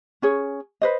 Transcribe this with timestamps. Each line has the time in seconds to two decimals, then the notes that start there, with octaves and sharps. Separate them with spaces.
0.22 C#4 G#4 C#5
0.82 B4 C5 D#5